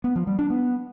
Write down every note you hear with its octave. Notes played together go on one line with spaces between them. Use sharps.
B3
F3
G3
D4
B3